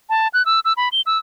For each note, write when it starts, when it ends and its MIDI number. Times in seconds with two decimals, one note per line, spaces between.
0.10 0.28 81
0.34 0.45 90
0.46 0.60 88
0.65 0.73 88
0.77 0.89 83
0.92 1.01 103
1.06 1.18 88